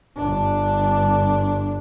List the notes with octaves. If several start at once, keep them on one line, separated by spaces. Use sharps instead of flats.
G1 D4